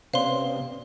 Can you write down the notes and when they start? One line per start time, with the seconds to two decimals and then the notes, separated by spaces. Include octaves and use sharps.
0.14 C3 B3 C#4 C5 D5 F5 C6